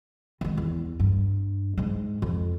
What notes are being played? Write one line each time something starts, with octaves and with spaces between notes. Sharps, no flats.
D#3 G#3
E2
G2
G#2 G#3
F2